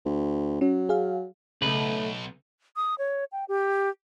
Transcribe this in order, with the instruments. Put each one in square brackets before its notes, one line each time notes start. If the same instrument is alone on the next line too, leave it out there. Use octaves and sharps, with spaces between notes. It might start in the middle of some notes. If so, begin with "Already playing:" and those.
[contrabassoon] D2
[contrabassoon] F#3 [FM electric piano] C#4
[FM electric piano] G#4 F5
[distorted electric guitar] B1 [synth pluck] C#3 [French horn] A3 [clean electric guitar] B4
[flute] D#6
C#5
G5
G4